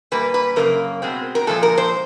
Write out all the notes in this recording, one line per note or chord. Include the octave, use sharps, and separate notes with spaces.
A#2 G3 A#3 B4
B4
F#2 C#3 A#3 A#4
B2 G#3 C4
A#4
A#2 F3 G#3 A4
A#4
C5